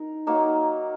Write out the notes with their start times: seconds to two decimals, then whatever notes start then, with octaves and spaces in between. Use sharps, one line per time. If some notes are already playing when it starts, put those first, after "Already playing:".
Already playing: D#4 A#4
0.27 F#3 A#3 D#4